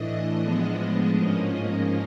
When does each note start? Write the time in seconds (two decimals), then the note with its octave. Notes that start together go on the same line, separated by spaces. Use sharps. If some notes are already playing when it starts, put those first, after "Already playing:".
Already playing: A2 E3 A3 D4 D#5
0.41 A2 F3 G#3 B3 D4
1.17 G#2 F3 A#3 C#4